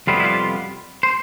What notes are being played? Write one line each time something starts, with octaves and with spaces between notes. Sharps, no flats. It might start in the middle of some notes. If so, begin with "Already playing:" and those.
F2 C3 G3 B3 E4 F4
E4
F4
C5